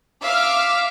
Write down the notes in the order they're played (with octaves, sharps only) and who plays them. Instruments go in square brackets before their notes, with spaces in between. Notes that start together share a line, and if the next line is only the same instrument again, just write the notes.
[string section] E5 F5 D6 F6